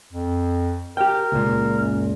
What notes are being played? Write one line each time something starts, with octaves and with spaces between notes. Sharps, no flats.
F2
G4 A#4 G5
C#2 A#2
F#2